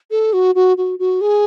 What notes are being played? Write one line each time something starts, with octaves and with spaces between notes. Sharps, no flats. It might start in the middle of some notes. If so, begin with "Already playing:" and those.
A4
F#4
F#4
F#4
F#4
G#4